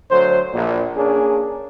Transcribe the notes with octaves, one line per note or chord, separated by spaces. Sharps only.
D2 F#3 C5
A#1 A#2
A#3 C#4 D4 G#4